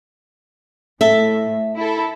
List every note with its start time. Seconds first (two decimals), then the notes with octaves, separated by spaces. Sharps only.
1.01 A2 A4 E5
1.76 E4 A4